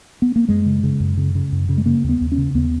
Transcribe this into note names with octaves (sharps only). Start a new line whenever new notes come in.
B3
A#3
F#2 G#3
C#3
C#3
F#2
C#3
C#3
F#2
C#3
G#3
C#3 A#3
D#2
B3
D#2
C#4
C#3
D#2 B3